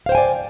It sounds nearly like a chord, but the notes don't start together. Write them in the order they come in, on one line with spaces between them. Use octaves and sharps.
F5 C5 G5 G#5 D5